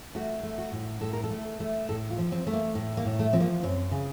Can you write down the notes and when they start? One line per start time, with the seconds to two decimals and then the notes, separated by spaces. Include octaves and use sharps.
0.15 A3 F#4
0.43 A3
0.58 F#4
0.72 A2
1.01 A2 A4
1.13 A#4
1.24 A4
1.31 A3
1.60 A3
1.89 A2 A4
2.10 F4
2.18 F3
2.32 C4
2.47 A3
2.53 A#3
2.75 A2
2.97 A#3
3.05 A2
3.19 A3
3.33 F3 C4
3.40 A#3
3.63 F#2 C4
3.91 C#3